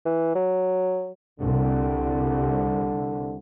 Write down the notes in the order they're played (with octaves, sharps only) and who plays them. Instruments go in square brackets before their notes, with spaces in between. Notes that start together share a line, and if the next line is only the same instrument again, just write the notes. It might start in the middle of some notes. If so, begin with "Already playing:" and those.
[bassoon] E3
F#3
[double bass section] C2 [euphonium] D3